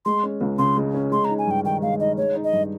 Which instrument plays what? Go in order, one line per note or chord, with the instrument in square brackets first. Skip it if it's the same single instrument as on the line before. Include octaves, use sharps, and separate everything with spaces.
[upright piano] G#3 [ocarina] C6
[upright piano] C#4
C#2
[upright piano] C#3 [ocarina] C6
[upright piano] G#3
C#4
[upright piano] G#3 [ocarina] C6
[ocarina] A#5
[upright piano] D#4
[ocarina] G#5
[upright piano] G2 [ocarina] G5
[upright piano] D#3 [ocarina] G5
[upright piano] G#3 [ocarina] F5
[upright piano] D#4 [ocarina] D#5
[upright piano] G#3 [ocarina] C#5
[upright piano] D#4
[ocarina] D#5
[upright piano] G2